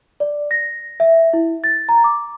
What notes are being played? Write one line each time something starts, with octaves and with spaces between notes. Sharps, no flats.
D5
A#6
E5
E4
A6
A#5
D6